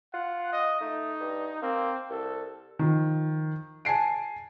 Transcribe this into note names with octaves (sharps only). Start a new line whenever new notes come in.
F4 F#5
D#5
A3 D#4
G2
A#3 C4
C2 A4
D#3 F3
G#5 A5 C7 D7